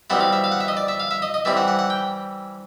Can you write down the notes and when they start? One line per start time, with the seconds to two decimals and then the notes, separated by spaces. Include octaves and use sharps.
0.10 B2 G3 C4 E4 F#5
0.21 F5
0.33 E5
0.44 F5
0.52 F#5
0.60 E5
0.68 D#5
0.77 D5
0.88 E5
1.00 F5
1.11 E5
1.22 D#5
1.34 D#5
1.45 E3 G3 C4 E4 E5
1.57 F#5
1.68 F#5
1.79 F#5
1.90 G5